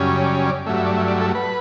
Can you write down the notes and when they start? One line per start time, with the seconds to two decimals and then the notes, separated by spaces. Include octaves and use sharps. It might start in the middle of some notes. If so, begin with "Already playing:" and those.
Already playing: F#2 C#3 G3 C#4
0.26 D5
0.46 D5
0.66 G2 F#3 A3 E5
0.76 E5
0.86 D5
0.97 E5
1.08 D5
1.21 A4
1.35 B4